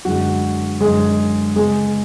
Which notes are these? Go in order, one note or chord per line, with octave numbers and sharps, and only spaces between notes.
F#2 D3 G#3 F#4
F#2 D3 G#3 G#4
C#3 G#3 B3 G#4